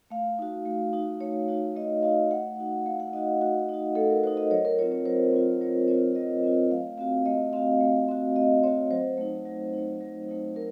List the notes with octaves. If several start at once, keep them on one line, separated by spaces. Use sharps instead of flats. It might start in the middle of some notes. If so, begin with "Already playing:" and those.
A3 F5
D#4 F#4
A3
D#4 F#4
A3 C#5
D#4 F#4
A3 D#5
D#4 F#4 F5
A3 F#5
D#4 F#4
A3 F5
F#5
D#4 F#4 D#5
A3 F#4
D#4 F#4
A3 A4
A#4
D#4 F#4 C5
D#5
F#3 C#5
A#4
C4 F4 C#5
C#5
F#3 C5
C4 F4
F#3 C#5
C4 F4 C#5
F#3 D#5
C4 F4
A3 F5
C4 F#4 F5
A3 D#5
C4 F#4 F5
A3
C4 F#4
A3 D#5
C4 F#4 C#5
F#3 C5
A3 D#4
F#3
A3 D#4
F#3
A3 D#4
F#3 A#4